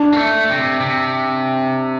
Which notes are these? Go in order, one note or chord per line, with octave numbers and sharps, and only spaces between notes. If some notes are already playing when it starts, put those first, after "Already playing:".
Already playing: D4
A#3
A3
C3
C3